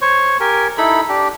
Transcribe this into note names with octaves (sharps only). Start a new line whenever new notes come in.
C5 C#5 C#6
G4 A#4 G#5
D#4 E4 A4 B5
D4 G4